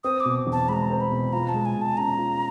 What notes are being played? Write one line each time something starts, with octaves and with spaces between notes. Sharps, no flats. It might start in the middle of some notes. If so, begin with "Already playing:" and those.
C4 D#6
D6
B2
E2
A5
G#3 A#5 B5
C4
B5
B2
F4 A#5
A5
G#3
G#5
B2
A5
C#4 A#5
F4